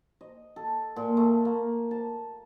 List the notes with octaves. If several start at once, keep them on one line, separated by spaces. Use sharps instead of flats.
D#5
A4
A#2
A3
A#3
A5